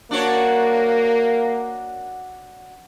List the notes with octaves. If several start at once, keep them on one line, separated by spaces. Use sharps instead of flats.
A#3 D4 F#4 C#5